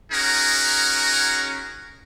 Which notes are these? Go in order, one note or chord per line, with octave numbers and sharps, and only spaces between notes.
C#4 D#4 F#4 G#4 A#4